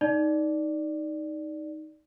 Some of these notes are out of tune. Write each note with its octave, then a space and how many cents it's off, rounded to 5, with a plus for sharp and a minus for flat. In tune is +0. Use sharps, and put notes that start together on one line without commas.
D#4 +5 D5 +0